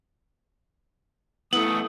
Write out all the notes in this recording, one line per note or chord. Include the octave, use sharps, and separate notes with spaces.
A3 B3 E4 D#6